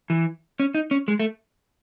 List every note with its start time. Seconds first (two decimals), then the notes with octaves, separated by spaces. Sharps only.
0.10 E3
0.60 C#4
0.75 D#4
0.91 C#4
1.08 G#3
1.19 A3